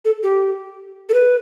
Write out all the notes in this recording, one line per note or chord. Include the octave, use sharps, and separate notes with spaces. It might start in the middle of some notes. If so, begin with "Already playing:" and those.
A4
G4
A4
B4